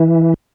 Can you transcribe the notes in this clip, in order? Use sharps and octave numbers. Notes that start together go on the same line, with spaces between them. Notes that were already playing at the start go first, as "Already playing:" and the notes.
Already playing: E3